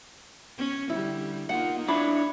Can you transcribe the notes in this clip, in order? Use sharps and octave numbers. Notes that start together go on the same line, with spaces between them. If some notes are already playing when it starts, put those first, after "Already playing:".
C#4
D3 G3 E4
A#3 D#4 F4 F#5
D4 E4 C#5 D5 B5